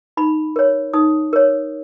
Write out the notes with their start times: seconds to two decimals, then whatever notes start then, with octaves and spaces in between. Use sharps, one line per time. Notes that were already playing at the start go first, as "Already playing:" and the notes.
0.17 D#4 B5
0.56 A#4 C#5
0.94 D#4 D#6
1.33 A#4 C#5